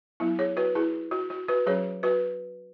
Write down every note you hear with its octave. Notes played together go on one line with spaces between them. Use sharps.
F#3 B3 E4
G#4 C#5
F#4 B4
E4 G#4
F#4
F#4
F#4 B4
F#3 C#4 G#4 C#5
F#4 B4